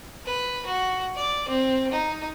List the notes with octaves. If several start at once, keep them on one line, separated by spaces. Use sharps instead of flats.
B4
F#4
D5
C4
D#4